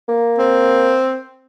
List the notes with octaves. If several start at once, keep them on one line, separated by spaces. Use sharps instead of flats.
A#3
C4